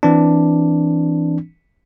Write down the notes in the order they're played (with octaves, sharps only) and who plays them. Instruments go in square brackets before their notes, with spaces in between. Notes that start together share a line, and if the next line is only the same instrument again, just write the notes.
[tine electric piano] E3 C4 D4